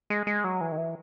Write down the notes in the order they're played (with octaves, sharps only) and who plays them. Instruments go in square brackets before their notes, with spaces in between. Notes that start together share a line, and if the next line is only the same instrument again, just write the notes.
[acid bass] G#3
G#3
F#3
E3
D#3
E3